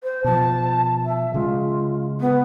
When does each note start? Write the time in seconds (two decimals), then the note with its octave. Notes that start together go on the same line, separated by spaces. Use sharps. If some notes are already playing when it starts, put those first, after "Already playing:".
0.03 C5
0.24 B2 F3 A5
1.05 E5
1.34 C#3 G#3 F4
2.21 B3